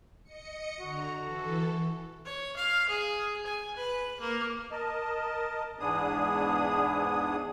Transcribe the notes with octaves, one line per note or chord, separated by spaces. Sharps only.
D#5 C#7
D3 F#4 A#5
E3 A4
C#5
F5
G#4
G#5
B4
A#3
A#4 D#5 A5
E2 G#2 B3 D4 G#4 D#6